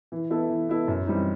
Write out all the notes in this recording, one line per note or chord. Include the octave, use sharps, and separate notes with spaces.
E3
B3 E4 A4
E3
B3 E4 A4
F#2
E3 G3 C4 D#4